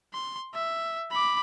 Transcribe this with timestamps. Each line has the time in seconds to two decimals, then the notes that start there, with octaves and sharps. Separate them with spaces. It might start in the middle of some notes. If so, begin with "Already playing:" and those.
0.14 C6
0.54 E5
1.12 B5 D6